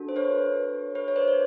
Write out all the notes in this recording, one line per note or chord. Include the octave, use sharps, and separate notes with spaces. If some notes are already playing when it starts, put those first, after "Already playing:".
Already playing: D4 F#4 A4
C5
B4 C#5
B4 C#5
C#5
C5 D5
D5